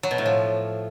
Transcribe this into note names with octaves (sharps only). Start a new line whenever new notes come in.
F#3
B2
A2
F3